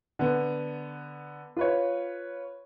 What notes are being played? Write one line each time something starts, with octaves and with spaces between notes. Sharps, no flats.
D3 B3
F4 B4 C#5